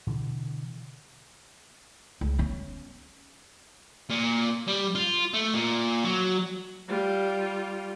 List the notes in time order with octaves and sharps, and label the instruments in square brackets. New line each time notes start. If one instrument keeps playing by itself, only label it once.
[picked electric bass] B2 D3 E3
[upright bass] C#2
B3 C#4
[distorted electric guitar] A#2
G3
F4
A3
A#2
F#3
[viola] G3 F4